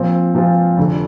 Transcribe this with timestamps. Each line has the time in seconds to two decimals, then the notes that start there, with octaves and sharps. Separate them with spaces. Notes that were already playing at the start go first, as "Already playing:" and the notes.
Already playing: A#2 F3 C4 F4
0.34 A#2 F3 C4 F4
0.77 F1 F2 D3